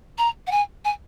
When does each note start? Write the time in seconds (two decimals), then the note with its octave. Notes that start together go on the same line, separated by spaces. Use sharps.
0.18 A#5
0.47 F#5
0.51 G#5
0.85 G#5